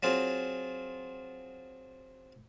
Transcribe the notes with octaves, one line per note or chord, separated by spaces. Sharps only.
F#3 C4 F4 G#4